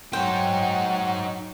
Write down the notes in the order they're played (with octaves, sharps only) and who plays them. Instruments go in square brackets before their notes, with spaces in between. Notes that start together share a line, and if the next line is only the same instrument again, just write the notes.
[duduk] F#3 [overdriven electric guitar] D#4 C5 [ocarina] F#5 [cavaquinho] G5